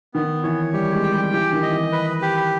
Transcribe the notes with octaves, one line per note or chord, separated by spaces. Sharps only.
D#3 B3
E3 C#5
G3 G4
G#3
G5
G3
E3 G4
D#3
D#5
E3
B4
G4